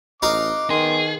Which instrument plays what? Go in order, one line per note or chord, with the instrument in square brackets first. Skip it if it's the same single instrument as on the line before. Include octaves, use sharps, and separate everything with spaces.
[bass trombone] A1 [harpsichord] D#4 F#4 F5 [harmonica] D6
[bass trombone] D#3 [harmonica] B3 C6 [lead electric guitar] G#4